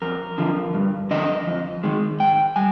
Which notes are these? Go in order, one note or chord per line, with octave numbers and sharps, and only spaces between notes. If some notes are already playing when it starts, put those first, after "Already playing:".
F2 A#4
D3 F3
G2
D3 F3 D#5
F2
D#3 G#3
G#2 G5
G3 G#5